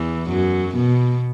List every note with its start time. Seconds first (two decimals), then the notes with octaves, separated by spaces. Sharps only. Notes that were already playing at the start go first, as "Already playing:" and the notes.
Already playing: E2 E3
0.29 F#2 F#3
0.75 B2 B3